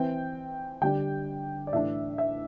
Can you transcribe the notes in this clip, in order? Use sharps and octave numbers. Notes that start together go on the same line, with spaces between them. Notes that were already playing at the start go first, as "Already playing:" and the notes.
Already playing: E3 C4 G5
D3 G3 D4 G5
D5
A2 E3 A3 D4 E5
E5